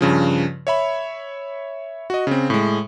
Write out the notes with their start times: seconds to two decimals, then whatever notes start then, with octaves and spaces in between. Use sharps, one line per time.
0.01 G2 C#3 F3
0.67 C#5 E5 B5
2.10 F#4 D#5
2.27 C#3 C4
2.50 A2 G#3